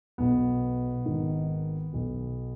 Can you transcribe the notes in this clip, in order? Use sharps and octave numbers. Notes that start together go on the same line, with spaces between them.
B1 B2 B3
G#1 G#2 D#3
B1 B2